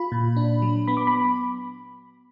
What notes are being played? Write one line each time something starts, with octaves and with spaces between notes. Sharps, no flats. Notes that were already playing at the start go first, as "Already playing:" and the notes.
Already playing: F4 B5
A#2
D4
F#3
B3 B5
D6
B5